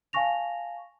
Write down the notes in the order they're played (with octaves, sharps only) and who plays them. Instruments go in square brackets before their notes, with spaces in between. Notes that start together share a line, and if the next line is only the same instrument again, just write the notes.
[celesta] F5 G#5 A5 C#6 A#6 F7